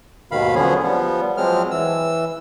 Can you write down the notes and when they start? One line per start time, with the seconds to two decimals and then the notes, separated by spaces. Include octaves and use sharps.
0.31 D#2 G#2 B2 D#3 F5 B5
0.55 D3 F3 F#3 B3 C#4 G#4
0.83 F3 G3 B3
1.37 F3 F#3 G#3 C4 F6
1.71 E3 E6